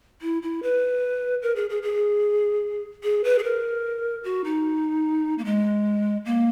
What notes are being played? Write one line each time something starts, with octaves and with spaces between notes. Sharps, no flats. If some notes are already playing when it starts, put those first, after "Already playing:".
E4
E4
B4
A#4
G#4
G#4
G#4
G#4
B4
G#4
A#4
F#4
D#4
A#3
G#3
A#3